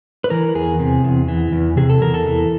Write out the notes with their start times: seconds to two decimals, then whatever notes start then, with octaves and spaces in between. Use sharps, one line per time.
0.24 B4
0.30 E3 A#4
0.55 E2 G#4
0.79 C3
1.04 E2
1.28 E3
1.52 E2
1.77 C3 G#4
1.90 A4
2.02 E2 A#4
2.14 A4
2.26 E3